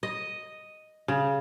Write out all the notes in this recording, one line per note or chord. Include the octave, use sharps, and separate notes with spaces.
D#5
C#3